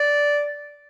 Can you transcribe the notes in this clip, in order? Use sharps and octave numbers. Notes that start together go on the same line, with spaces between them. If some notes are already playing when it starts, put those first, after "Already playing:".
Already playing: D5